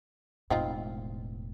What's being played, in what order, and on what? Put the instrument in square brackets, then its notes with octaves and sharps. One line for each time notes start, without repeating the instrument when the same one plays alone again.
[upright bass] E1 A2 [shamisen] C4 D#4 F4